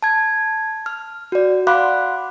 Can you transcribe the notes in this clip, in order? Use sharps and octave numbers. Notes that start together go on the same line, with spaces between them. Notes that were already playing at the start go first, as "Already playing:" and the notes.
A5 G#6
F6
F#4 D5
F5 F#5 B5 C6 D6 F#6